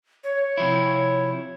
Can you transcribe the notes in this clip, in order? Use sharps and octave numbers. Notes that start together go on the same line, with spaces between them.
C#5
C3 F3 E4